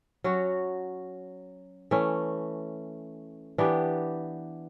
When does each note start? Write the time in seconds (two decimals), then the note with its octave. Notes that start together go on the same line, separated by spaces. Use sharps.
0.24 F#3 C#4 F#4
1.91 E3 A3 C#4
3.58 E3 B3 D4 G4